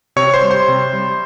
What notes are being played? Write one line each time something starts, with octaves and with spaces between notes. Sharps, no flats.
C3 C#5 C#6
C5 C6
G3
C5 C6
C3
G3